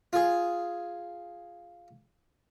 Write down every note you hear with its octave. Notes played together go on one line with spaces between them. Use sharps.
F4 G#4